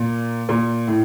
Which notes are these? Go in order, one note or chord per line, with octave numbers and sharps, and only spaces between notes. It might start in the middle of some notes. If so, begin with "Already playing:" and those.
Already playing: A#2
A#2
A2